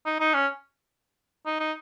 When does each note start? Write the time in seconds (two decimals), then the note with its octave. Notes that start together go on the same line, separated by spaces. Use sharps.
0.06 D#4
0.20 D#4
0.34 C#4
1.46 D#4
1.60 D#4